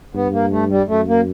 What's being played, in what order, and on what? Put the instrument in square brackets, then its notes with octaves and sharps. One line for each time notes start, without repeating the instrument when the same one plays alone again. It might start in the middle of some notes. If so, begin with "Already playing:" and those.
[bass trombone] G2 [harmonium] B3
[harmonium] A#3
A3
G3
[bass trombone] F#2 [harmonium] A3
[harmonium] A#3